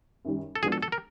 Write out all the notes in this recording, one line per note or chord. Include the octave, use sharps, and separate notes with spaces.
F#2 D#3 G3
A4
F3 G#3 B3 D4 F#4 G#4
A4
A4
A#4